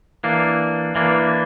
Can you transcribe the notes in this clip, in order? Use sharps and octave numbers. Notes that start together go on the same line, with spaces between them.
E3 A#3 D4
E3 A#3 D4